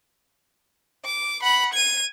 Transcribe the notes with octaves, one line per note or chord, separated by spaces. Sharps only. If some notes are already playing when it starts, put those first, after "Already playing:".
D6
F#5 B5
G#6 D#7